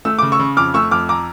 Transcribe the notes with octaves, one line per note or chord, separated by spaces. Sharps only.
A3 E6
C#3 D6
C#6 E6
C#3
F2 D6 F6
A3 C#6 E6
F2 D6 F6
A#5 D6